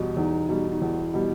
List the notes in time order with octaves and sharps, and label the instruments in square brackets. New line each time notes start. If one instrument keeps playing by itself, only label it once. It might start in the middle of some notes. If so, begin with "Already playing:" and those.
Already playing: [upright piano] E2 B2 G3
[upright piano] E2 [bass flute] D#4
[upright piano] B2 G3
[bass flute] D#4
[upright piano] E2 [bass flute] E4
[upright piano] B2 G3